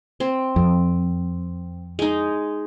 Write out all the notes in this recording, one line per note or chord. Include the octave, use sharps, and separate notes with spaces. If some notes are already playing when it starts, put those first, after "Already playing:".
C4
F2
G#3 D#4